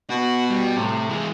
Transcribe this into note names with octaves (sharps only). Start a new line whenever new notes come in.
B2 F#4
G3
A2 C3
E3 G#3